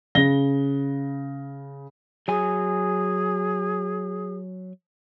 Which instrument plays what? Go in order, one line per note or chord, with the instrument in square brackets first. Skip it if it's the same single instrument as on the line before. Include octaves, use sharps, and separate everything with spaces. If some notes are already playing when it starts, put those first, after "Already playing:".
[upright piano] C#3 A#6 G7
[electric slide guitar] F#3 G#5 [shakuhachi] G#4